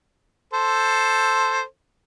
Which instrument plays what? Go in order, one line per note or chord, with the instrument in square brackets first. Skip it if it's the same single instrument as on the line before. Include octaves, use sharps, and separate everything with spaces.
[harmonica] A4 C5